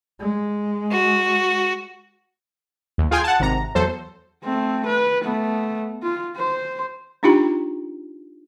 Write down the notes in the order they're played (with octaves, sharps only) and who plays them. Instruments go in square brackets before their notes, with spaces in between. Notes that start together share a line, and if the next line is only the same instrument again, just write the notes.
[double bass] G#3
[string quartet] F#4
[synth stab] D#2
F4 G#4 G5 G#5 C6
F#5 A5
G#1 C3 A#5
E2 F#3 A4 C5
[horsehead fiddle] A3 C4
B4
A3 B3
F4
C5
[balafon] D4 D#4 F4 G4 G5 B5